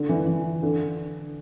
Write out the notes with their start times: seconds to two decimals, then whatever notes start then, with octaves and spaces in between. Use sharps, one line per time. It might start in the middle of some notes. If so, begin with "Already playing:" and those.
Already playing: D3
0.09 E3
0.27 E3
0.63 D3